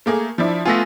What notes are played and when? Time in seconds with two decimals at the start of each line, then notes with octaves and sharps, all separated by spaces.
0.06 A3 A#3 G#4
0.38 F3 D4 E4
0.65 A3 B3 F4 G#5 E6 A#6